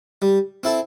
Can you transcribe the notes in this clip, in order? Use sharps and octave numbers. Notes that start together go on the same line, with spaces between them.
G3
C4 E4 A4